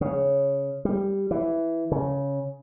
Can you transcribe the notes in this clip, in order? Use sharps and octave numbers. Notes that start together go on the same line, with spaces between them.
C#3
G3
E3
C#3